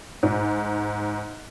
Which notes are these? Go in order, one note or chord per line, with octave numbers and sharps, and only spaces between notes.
G#2